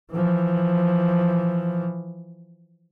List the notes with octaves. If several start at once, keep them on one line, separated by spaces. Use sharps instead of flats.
E3 F3